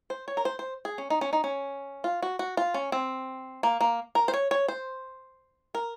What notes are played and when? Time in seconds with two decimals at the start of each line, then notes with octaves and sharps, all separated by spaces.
0.10 C5
0.28 C#5
0.37 A#4
0.45 C5
0.59 C5
0.85 G#4
0.98 C#4
1.10 D#4
1.21 C#4
1.33 D#4
1.44 C#4
2.04 F4
2.23 F#4
2.39 F#4
2.57 F4
2.74 C#4
2.92 C4
3.63 A#3
3.81 A#3
4.15 A#4
4.28 C5
4.34 C#5
4.51 C#5
4.68 C5
5.75 A#4